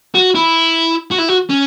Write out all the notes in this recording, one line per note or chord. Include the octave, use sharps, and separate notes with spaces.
F#4
E4
F#4
E4
F#4
C#4